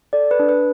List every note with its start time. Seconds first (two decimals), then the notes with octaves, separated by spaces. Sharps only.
0.13 A4 D5
0.31 B4
0.40 D4
0.49 B4